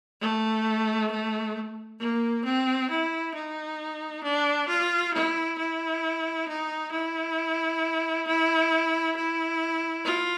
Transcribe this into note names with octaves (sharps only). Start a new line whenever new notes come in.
A3
A3
A#3
C4
E4
D#4
D4
F4
E4
E4
D#4
E4
E4
E4
F4